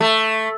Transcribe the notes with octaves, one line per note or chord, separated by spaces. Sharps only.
A3